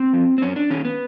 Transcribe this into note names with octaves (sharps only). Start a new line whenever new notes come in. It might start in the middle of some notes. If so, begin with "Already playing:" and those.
Already playing: C4
F3
C4
F#2 C#4
D4
D#3 C#4
B3